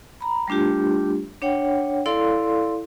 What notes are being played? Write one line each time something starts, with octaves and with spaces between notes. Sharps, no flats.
A#5 B5
G3 A3 D4 F4 G4
D4 C#5 F#5 G5
E4 A4 D5 F5 C6